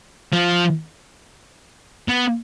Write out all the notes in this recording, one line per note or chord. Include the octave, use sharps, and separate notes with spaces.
F3
B3